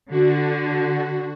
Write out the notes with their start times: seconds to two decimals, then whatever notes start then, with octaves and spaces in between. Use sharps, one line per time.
0.10 D3 F#4